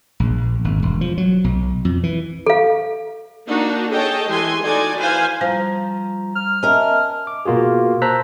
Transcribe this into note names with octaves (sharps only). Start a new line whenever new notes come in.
A#1
G#1
E1
F3
F#3
B1
F2
E3
A4 F5
A#3 D4 D#4 F#4
G#4 A4 C#5 D#5 G5 A5
E3 G#3 G4 G#5 C6
D#4 F#4 A4 D5 G#5
E3 B4 C5 F5 G#5
F3 G3 A#5
F6
C#4 A#4 D#5 E5 A5
D6
B2 A#3 F4 F#4 G#4
C5 A5 A#5 E6 F#6 B6